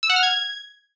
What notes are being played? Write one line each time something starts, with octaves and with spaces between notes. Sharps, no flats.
E6
F#5
F6
G#6